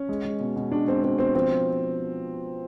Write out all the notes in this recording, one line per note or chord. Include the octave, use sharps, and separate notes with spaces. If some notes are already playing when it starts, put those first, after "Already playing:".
Already playing: C#4
G#3
G#3
B2
B2
G#3 D4
G#3 C4
B2 C4
B2 C4
F3 C4